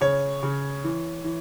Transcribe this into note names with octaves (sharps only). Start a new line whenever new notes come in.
C#3 C#5
C#3
E3
E3